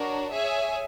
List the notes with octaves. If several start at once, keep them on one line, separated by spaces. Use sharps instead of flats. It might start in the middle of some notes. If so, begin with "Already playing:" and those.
Already playing: D4 F#4 A#4 C#5
G#4 C#5 E5 G#5